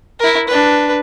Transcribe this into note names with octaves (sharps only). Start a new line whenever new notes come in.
E4 A#4
D4 B4